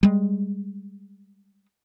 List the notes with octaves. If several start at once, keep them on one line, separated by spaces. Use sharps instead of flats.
G3 G#3